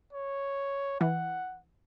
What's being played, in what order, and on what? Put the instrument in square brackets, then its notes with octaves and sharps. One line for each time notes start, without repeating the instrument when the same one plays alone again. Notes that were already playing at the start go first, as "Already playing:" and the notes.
[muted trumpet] C#5
[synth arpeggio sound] E3 [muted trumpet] F#5